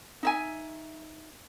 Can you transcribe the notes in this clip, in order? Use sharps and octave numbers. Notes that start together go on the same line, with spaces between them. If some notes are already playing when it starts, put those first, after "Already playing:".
D#4 E5 G#5